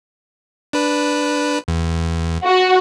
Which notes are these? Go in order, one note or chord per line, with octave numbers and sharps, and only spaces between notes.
D4 B4
E2
F#4